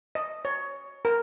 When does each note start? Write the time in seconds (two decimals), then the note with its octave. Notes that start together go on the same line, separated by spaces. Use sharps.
0.15 D#5
0.45 C#5
1.05 A#4